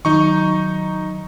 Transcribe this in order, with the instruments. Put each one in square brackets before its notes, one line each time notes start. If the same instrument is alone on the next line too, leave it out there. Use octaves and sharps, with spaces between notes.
[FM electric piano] D#3 F#3 [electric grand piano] D#4 C#6